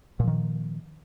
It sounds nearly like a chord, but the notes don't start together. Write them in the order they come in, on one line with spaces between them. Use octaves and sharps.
A#2 F3 D#3